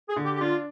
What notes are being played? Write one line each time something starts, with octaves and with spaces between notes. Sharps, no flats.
G#4
D3
G4
G4
D4 F4